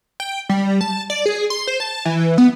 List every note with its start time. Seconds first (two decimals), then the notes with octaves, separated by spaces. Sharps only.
0.20 G5
0.49 G3
0.81 A5
1.10 D5
1.26 G#4
1.50 C6
1.67 C5
1.80 A5
2.05 E3
2.38 B3